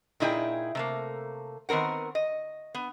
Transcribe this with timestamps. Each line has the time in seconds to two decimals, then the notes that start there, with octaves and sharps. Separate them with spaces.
0.20 A#2 D#4 E4 G#4 C5 G5
0.75 C3 A3 A#3
1.69 D#3 B3 C4 A#4 F#5
2.15 D#5
2.75 B3